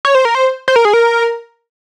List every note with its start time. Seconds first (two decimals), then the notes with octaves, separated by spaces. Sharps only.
0.05 C#5
0.15 C5
0.25 A#4
0.35 C5
0.68 C5
0.76 A#4
0.85 G#4
0.93 A#4